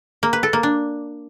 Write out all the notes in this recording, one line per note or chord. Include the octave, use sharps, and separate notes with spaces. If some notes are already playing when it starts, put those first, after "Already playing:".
A#3
B4
A4
A#3
D4